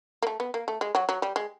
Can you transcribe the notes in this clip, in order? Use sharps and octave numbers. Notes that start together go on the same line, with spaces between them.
A#3
A3
B3
A#3
A3
G#3
F#3
F#3
G3
G#3